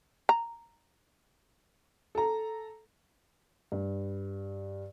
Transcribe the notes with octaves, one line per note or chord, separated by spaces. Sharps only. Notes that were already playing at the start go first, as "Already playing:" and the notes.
A#5
A4 A#5
G2